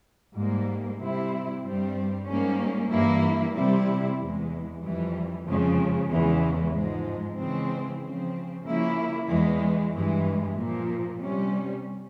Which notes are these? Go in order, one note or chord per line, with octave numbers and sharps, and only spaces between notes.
G#2 G3 A#3
C3 G3 C4 E4
G2 G3 C4
G#2 G3 A#3 C#4
G2 E3 A#3 E4
C3 G3 C4 E4
E2 E3 G#3
F2 E3 G3
F2 C#3 F3 G#3
E2 C#3 E3 G#3
G#2 F3 G#3
C#3 E3 G#3 C4
C#3 F3 C4
C#3 F3 A#3 E4
E2 E3 G#3
G2 E3 G#3
A#2 F3 A#3
C3 G3 C#4